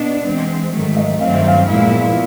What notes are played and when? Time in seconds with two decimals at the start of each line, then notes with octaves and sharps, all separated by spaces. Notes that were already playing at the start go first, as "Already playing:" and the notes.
Already playing: B2 B3 D4 D#5
0.25 E3 G#3 C4
0.73 G#2 D#3 F#3 A3
0.97 D#5
1.20 G2 D#3 F#3 A3 C4 F5
1.34 E5
1.47 F5
1.67 A#2 F3 G#3 B3 E4